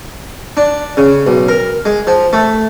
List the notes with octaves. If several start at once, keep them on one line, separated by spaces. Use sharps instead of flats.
D4
C#3
B1
A#4
G#3
F3
A3